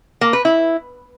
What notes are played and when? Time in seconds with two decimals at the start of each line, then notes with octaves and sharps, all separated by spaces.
0.21 A#3
0.33 B4
0.45 E4